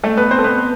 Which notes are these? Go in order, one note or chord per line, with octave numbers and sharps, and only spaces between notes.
A3 A4
B3 B4
C4 C5
A4
B3 B4